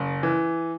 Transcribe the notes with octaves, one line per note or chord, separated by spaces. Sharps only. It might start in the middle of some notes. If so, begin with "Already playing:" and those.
Already playing: F#1
E3